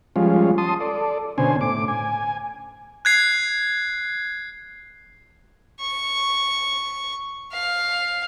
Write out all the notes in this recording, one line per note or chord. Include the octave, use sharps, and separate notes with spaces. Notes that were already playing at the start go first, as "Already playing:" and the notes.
F3 G3 G#3 C#4 F4
A5 C6 D#6
A4 D5
B2 D3 C#4 C5 G#5
A2 D6
G#5
F#6 G#6 C7
C#6
F5